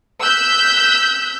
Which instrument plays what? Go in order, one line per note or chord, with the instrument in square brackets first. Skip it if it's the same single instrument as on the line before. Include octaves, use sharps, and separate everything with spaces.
[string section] E6 F#6 G6 B6